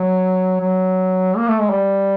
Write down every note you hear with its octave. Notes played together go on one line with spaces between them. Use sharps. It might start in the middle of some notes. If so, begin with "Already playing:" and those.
Already playing: F#3
F#3
A#3
A3
G#3
G3